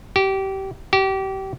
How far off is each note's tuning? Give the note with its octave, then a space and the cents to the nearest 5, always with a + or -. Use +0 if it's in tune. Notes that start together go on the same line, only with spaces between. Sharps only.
G4 -25
G4 -30